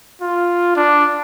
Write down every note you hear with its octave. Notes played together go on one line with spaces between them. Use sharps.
F4
D4